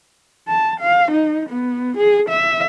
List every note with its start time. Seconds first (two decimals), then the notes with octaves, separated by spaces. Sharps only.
0.48 A5
0.80 F5
1.11 D#4
1.49 B3
1.97 G#4
2.29 E5